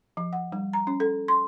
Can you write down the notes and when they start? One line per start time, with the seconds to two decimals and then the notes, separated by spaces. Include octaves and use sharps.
0.17 F3
0.33 F#5
0.52 G3
0.73 A#5
0.87 C#4
1.00 A4
1.28 C6